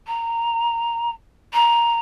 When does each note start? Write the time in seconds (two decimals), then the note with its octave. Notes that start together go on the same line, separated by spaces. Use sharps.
0.07 A#5
1.53 A#5